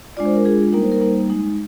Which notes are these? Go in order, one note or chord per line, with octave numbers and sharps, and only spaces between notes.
G#3 D4 F4 D5
C5
A#4
G#3 D4 F4 G#4
G3 A#3 D#4 A#4
C5
A#4
G3 A#3 D#4 C5
G#3 D#4